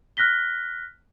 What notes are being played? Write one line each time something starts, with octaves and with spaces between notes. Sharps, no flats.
F6 F#6 A#6 B6 G7